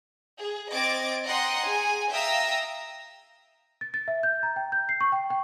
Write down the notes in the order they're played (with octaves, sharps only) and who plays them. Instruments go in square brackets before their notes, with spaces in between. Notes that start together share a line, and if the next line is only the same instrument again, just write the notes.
[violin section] G#4
C4 D#5 D6 G#6 A6 D7
D#5 F#5 G5 A#5 C6 D#6
G#4 G#5
E5 F5 G5 A#5 D#6 E6
[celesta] A6
A6
E5
G6
A#5
G5
G6
C7
C#6
G5
G5